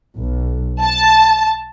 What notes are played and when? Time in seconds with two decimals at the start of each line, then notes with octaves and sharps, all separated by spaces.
0.17 B1
0.83 A5